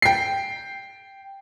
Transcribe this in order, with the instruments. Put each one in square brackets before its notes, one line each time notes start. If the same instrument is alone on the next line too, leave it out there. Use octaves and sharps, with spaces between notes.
[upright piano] G5 C7